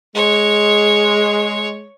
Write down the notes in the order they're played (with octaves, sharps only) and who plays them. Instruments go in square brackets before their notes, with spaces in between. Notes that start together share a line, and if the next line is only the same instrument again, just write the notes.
[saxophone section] G#3 [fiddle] C#5